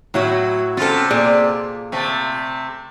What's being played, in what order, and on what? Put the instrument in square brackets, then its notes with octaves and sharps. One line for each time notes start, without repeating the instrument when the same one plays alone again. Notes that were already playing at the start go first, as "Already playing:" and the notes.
[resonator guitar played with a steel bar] A2 E4 F#4 [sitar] F#3
[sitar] C3 F4 [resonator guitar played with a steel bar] C#4 A4
[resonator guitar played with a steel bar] A#2 G#4 D5
[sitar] C3 A3